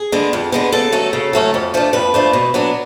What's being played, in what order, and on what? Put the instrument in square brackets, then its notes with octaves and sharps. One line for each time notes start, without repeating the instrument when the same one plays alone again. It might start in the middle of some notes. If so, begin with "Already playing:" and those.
Already playing: [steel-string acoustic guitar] G#4
D3 G#3 B3
F2
D3 G#3 B3
C#3 A4
F#3 A3 C#4
C#3
F#3 A3 C#4
F2
F3 A3 D4
F2 B4
F3 A3 D4
B2
F#3 B3 D4